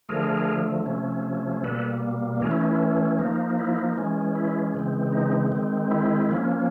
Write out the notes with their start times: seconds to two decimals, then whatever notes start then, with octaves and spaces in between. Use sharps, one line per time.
0.09 D3 F3 A3 G#4 A#4
0.86 C3 F3 A3 C#4
1.64 B2 G3 A#3 A4 B4
2.41 E3 A3 C#4 G#4 A#4
2.51 E4
2.61 D#4
2.71 E4
3.19 F3 A#3 D#4
3.58 E4
3.97 E3 G#3 C#4
4.35 E4
4.74 C#3 E3 G#3 C4
5.12 D#4
5.52 D#3 G#3 C4
5.91 E4
6.29 F3 A#3 C#4